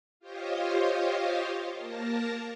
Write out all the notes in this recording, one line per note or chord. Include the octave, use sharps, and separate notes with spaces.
F4 G4 C5 C#5 D#5 F5
A#3 A#4 A5 A#5